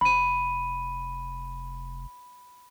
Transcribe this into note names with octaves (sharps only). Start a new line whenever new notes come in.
F1 B5 D#7